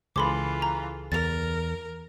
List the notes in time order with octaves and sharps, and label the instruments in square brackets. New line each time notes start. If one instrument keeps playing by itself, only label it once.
[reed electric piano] C#2 G#4 A4 [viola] E3 F4 [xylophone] B5 C6 D6
[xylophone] A#5
[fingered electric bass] E2 [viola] A#4 [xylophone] A6 F7